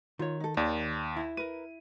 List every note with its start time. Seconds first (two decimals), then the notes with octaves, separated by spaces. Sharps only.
0.19 D#3 F4 C#5
0.40 D#4 A4
0.57 D#2 D5
1.16 E4
1.37 A#4 B4 D#7